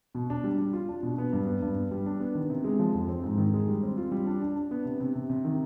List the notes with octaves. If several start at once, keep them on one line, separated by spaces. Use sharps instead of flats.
B2
D4
G3
G3
F4
D4
B2
B3
G2
B3
G2
B3
G3
D4
B3
D#3
C3
G#3
F3
F2
C4
G#2
D#3
G#3
G3
C4
F4
G3
D4
D4
D4
B3
C3
C3
C3
C3
D#3